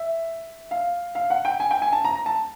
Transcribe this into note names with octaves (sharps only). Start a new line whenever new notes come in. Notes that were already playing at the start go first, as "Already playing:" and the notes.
Already playing: E5
F5
F5
F#5
G5
G#5
G5
G#5
A5
A#5
A#5
A5